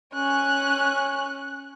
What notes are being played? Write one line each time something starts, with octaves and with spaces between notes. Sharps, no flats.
C#4 F#6